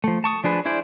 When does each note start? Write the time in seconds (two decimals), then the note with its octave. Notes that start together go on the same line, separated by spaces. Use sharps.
0.04 F3 A3
0.24 A5 C#6 D#6
0.44 F3 D4 G#4 B4
0.65 D4 E4 G#4 C5 D5